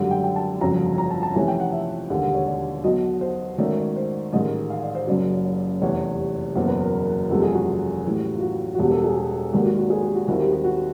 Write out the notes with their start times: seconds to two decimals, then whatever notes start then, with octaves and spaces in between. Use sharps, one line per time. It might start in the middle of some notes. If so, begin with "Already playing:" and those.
Already playing: G#1 F#2 D3 G3
0.11 G5
0.24 G5
0.36 A5
0.61 G1 F2 C#3 F#3 A#5
0.98 A#5
1.11 A5
1.23 A5
1.35 F2 C3 E3 A3 C#4 G#5
1.48 G5
1.60 F#5
1.72 E5
2.10 E1 D#2 D3 G3
2.35 C#5
2.46 D5
2.83 B1 B2 F#3 D#5
3.21 C5
3.58 G#2 D#3 F#3 A3 C#4 D5
3.78 C#5
3.96 C5
4.33 A1 G#2 D#3 G#3 D#5
4.70 F5
4.82 D5
4.95 C5
5.07 F#1 F#2 C#3 F#3 D5
5.81 F1 E2 C3 E3 G3 C#5
6.56 F#1 E2 B2 F#3 A#3 C5
6.68 B4
6.80 A#4
6.94 A#4
7.30 F#1 E2 C3 F3 G#3 A4
7.42 G#4
7.54 F#4
8.05 A2 E3 G3
8.36 F4
8.41 F#4
8.75 F#4
8.79 E1 E2 B2 G3 G4
8.91 A4
9.04 G#4
9.16 G4
9.53 G#1 G#2 D#3 F#3 A#3 G4
9.66 F#4
9.77 F#4
9.90 G#4
10.03 G4
10.15 F#4
10.28 D#2 D#3 G3 C4 E4 F#4
10.40 G4
10.53 G4
10.64 F#4